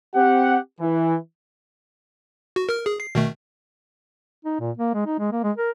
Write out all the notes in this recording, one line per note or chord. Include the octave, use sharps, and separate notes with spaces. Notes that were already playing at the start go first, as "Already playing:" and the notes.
C4 G4 F#5
E3
F#4
A#4 F6
G#4
C7
B2 D#3 A3
D#4
A#2
A#3
G#3
D#4
G#3
A#3
G#3
A#4